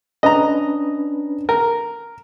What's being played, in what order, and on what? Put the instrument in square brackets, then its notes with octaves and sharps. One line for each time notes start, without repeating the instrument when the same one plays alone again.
[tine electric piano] C#4 D4 B4 [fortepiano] D#5 A#5
[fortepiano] A#4